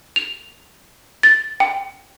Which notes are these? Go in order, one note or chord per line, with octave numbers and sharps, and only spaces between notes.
F7
A6
G5